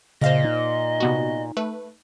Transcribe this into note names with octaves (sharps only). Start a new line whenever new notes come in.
A#2 C#3 C5 D#5 F5 A#6
D#4
C3 B3 F#4
A3 B4